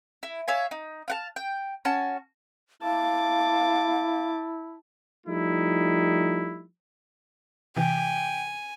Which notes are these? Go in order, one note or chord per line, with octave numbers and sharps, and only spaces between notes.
E4
C#5 E5 F5 G#5
D#4
F5 F#5 A5
G5
C#4 F#4 A5
E4 F5 A5 D6
F3 G3 A3 D#4 E4
C3 E3 G5 G#5